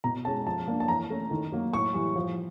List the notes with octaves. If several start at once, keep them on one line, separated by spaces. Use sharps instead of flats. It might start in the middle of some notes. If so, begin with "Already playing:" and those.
B2 A#5
G#3 C#4 A5
F3 A5
A#3 D4
A5
E3 A#5
A3 C#4
D#3
F#3 A#3
A2 C#6
E3 G3
F3